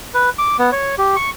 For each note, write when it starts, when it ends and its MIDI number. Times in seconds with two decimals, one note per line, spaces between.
0.14 0.30 71
0.38 0.57 86
0.59 0.70 59
0.72 0.95 73
0.98 1.16 67
1.16 1.30 85